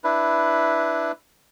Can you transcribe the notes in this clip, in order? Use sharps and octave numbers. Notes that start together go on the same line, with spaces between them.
D4 E4 B4